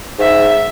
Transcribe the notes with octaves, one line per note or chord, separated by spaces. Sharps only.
G#2 E5